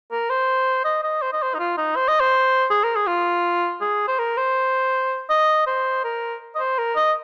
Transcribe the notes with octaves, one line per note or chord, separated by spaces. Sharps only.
A#4
C5
D#5
D#5
C5
D#5
C5
D#4
F4
D#4
C5
D#5
C5
G#4
A#4
G#4
F4
G#4
C5
A#4
C5
D#5
C5
A#4
D#5
C5
A#4
D#5